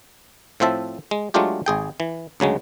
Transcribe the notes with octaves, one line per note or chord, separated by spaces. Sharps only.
A2 F3 C4 E5 A5
G#3
F#3 G#3 A3 D4 F4 G4
G#1 G#4 G5
E3
D2 C#3 F#3 G#3